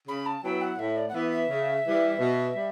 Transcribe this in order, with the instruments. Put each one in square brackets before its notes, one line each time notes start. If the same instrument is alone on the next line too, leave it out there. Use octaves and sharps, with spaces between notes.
[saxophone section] C#3 [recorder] B5
[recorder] A5
[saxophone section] F#3 B3 E4 B4 [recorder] G5
[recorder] F#5
[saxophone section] A2 [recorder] E5
[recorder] D5
F#5
[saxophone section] E3 B3 [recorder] E5
[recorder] E5
[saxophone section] C#3
E3 G3
B2
G3